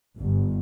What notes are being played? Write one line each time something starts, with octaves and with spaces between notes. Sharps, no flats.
G1